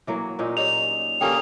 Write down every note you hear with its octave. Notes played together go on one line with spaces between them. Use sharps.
E3 F#3 A#3
A#2 C#4 D#4
D#4 G4 G#4 C#5 F7
D3 A#3 C#4 G4 G#4 A#4 G5